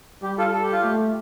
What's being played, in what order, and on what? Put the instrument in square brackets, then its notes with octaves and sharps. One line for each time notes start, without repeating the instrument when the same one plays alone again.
[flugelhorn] G3 [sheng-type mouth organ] G4
[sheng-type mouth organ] F4 A4
A4
G4
F4
[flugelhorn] A3 [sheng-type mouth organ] G4